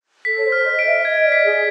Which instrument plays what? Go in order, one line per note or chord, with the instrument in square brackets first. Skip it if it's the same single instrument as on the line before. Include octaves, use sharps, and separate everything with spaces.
[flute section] A4 [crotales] B6
[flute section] C#5
C5
[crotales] F6
[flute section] D#5
[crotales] D7
[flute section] E5
E5
[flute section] D#5 [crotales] G#6
[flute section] D5
[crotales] B6
[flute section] G#4